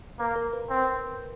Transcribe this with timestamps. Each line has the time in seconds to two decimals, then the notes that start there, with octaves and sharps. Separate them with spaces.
0.19 A#3 B4
0.36 A#4
0.53 B4
0.70 C4